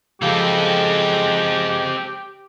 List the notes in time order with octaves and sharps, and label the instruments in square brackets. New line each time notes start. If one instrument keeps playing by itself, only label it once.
[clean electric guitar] C#3 F3 F5 [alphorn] G#3 [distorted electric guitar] C4 A4 [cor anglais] G4